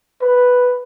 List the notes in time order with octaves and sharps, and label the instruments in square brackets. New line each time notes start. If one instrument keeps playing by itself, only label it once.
[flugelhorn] B4